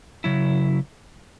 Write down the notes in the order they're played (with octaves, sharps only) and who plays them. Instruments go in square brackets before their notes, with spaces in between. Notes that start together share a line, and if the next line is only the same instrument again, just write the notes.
[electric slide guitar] C#3 F#3 E4